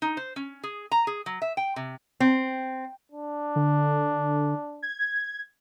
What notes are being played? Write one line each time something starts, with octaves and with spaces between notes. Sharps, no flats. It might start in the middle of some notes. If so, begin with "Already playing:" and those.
D#4
C5
C#4
G#4
A#5
G#4
F#3
E5
G5
C3
C4
D4
D3
G#6